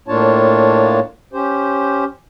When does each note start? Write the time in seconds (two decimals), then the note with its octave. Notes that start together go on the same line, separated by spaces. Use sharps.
0.08 A2 A#3 D4 F4 C#5 A5
1.33 C#4 G4 C5